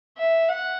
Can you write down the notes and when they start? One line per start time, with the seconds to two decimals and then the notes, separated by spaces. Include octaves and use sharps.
0.18 E5
0.49 F#5